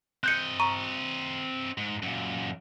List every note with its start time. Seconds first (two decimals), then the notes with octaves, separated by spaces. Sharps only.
0.24 C4 D#5 F#6 G6 C#7
0.60 A#5 C#6 D#7
1.78 G#2
2.03 F#2 A#2